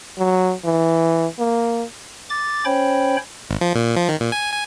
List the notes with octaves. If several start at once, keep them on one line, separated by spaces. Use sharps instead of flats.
F#3
E3
A#3
D6 A6
C#4 C5 C#5 G5 B5
G#1
F3
A#2
F3
D#3
A#2
G#5
G#5